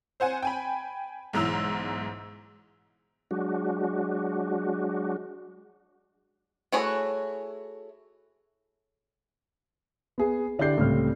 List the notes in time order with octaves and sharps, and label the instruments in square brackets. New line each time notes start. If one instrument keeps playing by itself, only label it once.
[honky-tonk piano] C4 C5 F#5 G#5
G5 G#5 B5
B1 G#2 E3 A#5 E6
[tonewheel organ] F#3 G#3 D4 F#4
[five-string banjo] A3 E4 F#4 G#4 C#5
[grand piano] B3 G#4
D3 D4 E4 G4 G6 C7
C#2 A2 G3 C4 F6